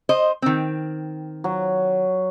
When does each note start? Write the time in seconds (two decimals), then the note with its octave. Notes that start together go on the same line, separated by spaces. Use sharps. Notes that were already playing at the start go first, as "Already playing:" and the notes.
0.09 C5 D#5
0.42 D#3 C4
1.44 F#3